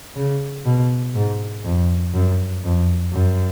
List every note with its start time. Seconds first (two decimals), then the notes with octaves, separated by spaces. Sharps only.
0.16 C#3
0.65 B2
1.15 G#2
1.65 F2
2.14 F#2
2.64 F2
3.13 F#2